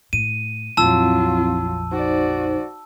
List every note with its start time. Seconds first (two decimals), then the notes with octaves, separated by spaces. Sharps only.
0.13 A2 D#7
0.77 A#1 F2 F#3 C4 E4 F4 A5 E6
1.91 D#4 F#4 C5 D5